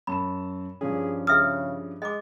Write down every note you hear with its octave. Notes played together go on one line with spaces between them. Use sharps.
F#2 A5 B5 E7
G2 F3 C#4 G#4
C#3 G#4 E5 D#6 F6
G#3 D#5 D6